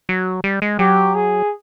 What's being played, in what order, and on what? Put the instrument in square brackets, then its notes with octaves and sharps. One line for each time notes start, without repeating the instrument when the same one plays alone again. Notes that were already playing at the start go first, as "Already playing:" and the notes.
[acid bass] F#3
G3
G#3
[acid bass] F#3 [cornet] G4
[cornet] G#4